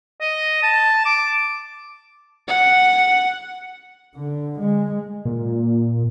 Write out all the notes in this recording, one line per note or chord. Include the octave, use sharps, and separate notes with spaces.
D#5
A5
D6
F#5
D3
G#3
A#2